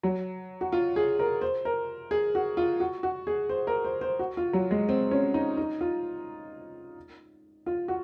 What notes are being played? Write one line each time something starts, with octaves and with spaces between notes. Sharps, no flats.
F#3
F#4
F4
G#4
A#4
C5
A#4
G#4
F#4
F4
F#4
F#4
G#4
C5
A#4
C5
C5
F#4
F4
F#3
G#3
C4
C#4
D#4
D#4
F4
F4
F#4